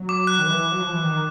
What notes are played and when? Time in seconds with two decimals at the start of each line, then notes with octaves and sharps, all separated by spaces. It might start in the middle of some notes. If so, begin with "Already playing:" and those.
Already playing: F#3
0.09 D6
0.27 F#6
0.39 D#3
0.47 E3
0.71 F#3
0.82 F3
0.93 E3
1.04 D#3